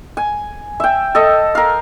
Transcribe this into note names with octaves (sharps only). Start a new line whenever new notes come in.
G#5
E5 G5
A4 D#5
A#4 F5